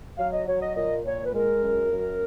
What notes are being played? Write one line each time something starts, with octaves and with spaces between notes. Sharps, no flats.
F#3 F5
D#5
F#3 C#5
D#5
A#2 D#5
A#2 C#5
B4
G#3 A#4
F#2
F#2